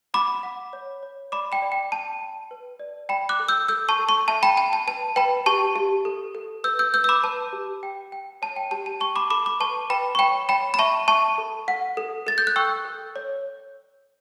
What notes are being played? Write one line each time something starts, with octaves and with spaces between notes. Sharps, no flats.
F#5 B5 D6
F#5
C#5
C#5
D5 B5 D6
G5 B5
D5
G5
G5 A5
G5
B4
D5
D5 G5 B5
D6 F#6
A4
E6 G6
A4 E6 G6
A5 C#6
A4
A5 C#6
E5 A5
G5 B5
G5 A5
A5
B4 A5
B4 G5 B5
G4 A5 C#6
G4
A4
A4
B4 E6 G6
E6 G6
B4 E6 G6
E6
B5 D6
B4 A5
G4
G5
G5
C#5 A5
G5
G4 A5
A5
G5 A5 C#6
B5 D6
A4 B5 D6
B5 D6
B4 A5 C#6
B4 G5 B5
C#6
C#5 G5 B5
C#5 G5 B5
B5
E5 A5 C#6
E5 A5 C#6
A4
F#5
A4
A4 A6
G6
F#6
G5 C#6 E6
A4
C#5